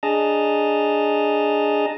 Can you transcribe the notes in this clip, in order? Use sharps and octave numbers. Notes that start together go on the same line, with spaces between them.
D4 G#4 D#5 A5 A#5